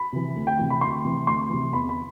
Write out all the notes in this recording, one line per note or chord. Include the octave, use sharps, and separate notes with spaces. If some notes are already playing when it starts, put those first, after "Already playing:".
Already playing: B5
C3 E3
D2
G5
C3 E3
B5
D2 C6
C3 E3
D2 C6
C3 E3
E2 B5
B5